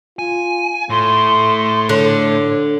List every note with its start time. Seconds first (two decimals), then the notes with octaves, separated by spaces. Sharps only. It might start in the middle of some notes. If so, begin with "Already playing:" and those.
0.19 F4 G#5
0.90 A2 A3 C6
1.89 D3 C#5